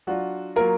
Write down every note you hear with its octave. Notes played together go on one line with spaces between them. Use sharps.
F#3 D4 F4 F#4
F#3 A#3 F4 A#4